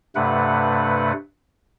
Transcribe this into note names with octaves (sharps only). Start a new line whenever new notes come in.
G2 C3 A3 B4 F#5